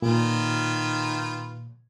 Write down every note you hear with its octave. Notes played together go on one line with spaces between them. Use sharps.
A#2 D#3 F4 B4